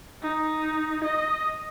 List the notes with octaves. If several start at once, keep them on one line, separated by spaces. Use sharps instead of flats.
D#4
D#5